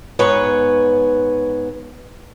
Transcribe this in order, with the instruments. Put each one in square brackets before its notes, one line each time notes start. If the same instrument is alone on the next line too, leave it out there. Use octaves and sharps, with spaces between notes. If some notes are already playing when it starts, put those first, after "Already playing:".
[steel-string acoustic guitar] G#2 B3 B4 C#5